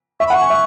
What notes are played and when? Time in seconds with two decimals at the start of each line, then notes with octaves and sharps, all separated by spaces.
0.20 E5 C#6
0.27 B5
0.30 F#5
0.34 C#6
0.41 G#5
0.50 E5